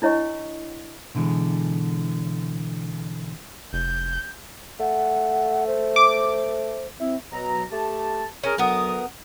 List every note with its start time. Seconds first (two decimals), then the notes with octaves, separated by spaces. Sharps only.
0.02 D4 E4 C#5 D#5 C#6
1.15 B2 D3 E3 G#3
3.73 F1 G6
4.80 A3 F#5
5.67 C5
5.96 D6
7.00 C4 E4
7.31 B2 F#3 A#5
7.71 A3 G4 A5
8.43 C#4 G#4 A#4
8.58 D2 F#3 B3 A#4 D#6